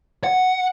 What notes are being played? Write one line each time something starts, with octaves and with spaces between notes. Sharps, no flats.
F#5